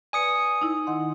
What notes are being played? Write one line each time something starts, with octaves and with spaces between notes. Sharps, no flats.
B4 D5 G#5 D#6 C#7
D#4 E4
D#3 F#5 C6